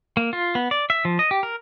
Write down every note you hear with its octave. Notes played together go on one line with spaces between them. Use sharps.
A#3
F4
B3
D5
E5
F3
D#5
G4
A#4